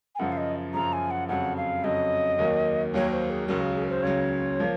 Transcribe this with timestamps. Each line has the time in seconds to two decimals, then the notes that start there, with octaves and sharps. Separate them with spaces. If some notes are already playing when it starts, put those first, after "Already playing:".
0.15 G#5
0.19 F#2 C#3 F3 F#5
0.32 F5
0.37 D#5
0.74 F#2 C#3 F3 A#5
0.93 G#5
1.10 F#5
1.28 F2 C#3 F#3 F#5
1.57 F5
1.83 F2 C#3 F#3 D#5
2.39 D#2 D#3 F#3 A#3
2.93 D#2 D#3 F#3 A#3 C#5
3.11 C5
3.30 G#4
3.48 C#2 C#3 F#3 A#4
3.61 G#4
3.75 G#4
3.83 A#4
3.89 C5
4.03 C#2 C#3 F#3 C#5
4.60 F3 A#3